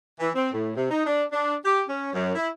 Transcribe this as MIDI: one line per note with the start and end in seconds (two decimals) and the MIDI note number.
0.20 0.30 52
0.35 0.52 60
0.53 0.71 45
0.76 0.87 48
0.91 1.03 63
1.06 1.23 62
1.32 1.55 62
1.65 1.82 67
1.89 2.11 61
2.13 2.33 42
2.35 2.48 64